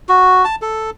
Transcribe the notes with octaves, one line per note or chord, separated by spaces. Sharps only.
F#4
A5
A4